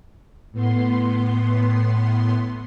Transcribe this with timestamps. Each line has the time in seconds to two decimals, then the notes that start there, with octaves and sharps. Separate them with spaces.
0.52 A2 B3 C6